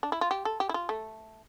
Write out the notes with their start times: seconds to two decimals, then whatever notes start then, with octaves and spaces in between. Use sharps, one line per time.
0.03 D4
0.12 E4
0.21 F4
0.31 G4
0.45 A4
0.60 G4
0.69 E4
0.74 F4
0.89 A3